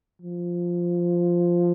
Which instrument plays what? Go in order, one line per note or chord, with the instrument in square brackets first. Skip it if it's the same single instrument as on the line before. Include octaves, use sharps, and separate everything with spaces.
[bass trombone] F3